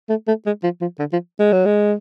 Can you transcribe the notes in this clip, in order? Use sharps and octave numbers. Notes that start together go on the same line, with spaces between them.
A3
A3
G#3
F3
F3
D3
F3
G#3
F#3
G#3